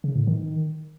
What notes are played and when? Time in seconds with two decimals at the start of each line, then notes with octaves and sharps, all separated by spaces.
0.04 C#3
0.16 A2
0.27 D#3